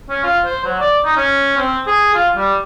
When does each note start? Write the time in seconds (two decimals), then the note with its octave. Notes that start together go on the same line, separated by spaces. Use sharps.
0.10 C#4
0.24 F4
0.45 C5
0.65 F#3
0.80 D5
1.05 D#4
1.17 C#4
1.58 C4
1.87 G#4
2.15 F4
2.36 G3